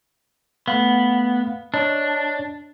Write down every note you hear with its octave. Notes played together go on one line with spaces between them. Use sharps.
A3 B3 F5
D4 C#5 D#5 A5